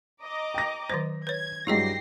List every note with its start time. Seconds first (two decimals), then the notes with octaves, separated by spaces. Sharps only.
0.22 D#5 A#5 D6
0.54 G5 A#6
0.90 D#3 F#3 C5 A#6
1.27 B4 C#5 G#6
1.67 G2 F#3 E4 G4 G#4 D#5 A#6 C7